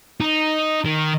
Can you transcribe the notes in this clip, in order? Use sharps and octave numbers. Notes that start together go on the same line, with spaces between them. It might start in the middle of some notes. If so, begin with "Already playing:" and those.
D#4
D#3